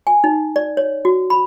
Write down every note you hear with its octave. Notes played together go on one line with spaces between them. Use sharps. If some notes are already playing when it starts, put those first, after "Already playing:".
G#5
D#4
D5
C#5
F#4
B5